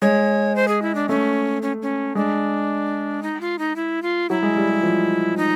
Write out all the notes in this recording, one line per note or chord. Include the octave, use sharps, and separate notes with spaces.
G#3 C#5
C5
G#4
E4
D4
A3 C#4
C#4
C#4
G#3 D4
D#4
F4
D#4
E4
F4
F#3 E4
G#3
G3
G3
F3
D#4